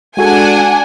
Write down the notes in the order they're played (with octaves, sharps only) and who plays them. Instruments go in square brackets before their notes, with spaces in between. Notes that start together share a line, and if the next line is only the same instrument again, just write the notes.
[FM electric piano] G#3 F#4 A4 [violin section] D4 F#5 G#5